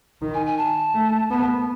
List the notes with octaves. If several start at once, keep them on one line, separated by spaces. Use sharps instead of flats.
D#3
G#5
G#5
A5
A3
B3